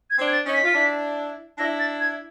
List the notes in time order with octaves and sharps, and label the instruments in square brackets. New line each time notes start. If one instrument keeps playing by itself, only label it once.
[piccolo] G#6
[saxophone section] C4 D4
[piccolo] G#6
A6
[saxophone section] C#4 D#4
[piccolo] B6
[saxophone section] F4
D4 E4
[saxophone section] D4 E4 [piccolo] A#6
[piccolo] A6
G#6